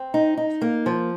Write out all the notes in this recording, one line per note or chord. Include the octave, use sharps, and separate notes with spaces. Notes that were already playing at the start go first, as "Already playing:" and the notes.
Already playing: C4
D#4
D#4
A#3
F3